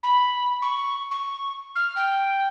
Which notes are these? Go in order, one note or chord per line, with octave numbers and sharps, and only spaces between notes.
B5
C#6
C#6
F6
G5